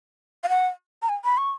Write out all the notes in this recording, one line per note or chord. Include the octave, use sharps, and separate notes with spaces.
F5
F#5
A#5
G#5
B5
C#6